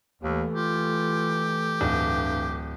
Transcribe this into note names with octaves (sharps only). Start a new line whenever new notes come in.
D#2 E3 A3
F4 G4
D1 G2